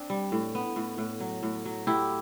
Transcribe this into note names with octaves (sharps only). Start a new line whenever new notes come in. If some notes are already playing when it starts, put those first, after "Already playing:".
Already playing: C4 D4
G3
A2
B3
A2
A2
F#3
A2
F#3
A2 E4 G4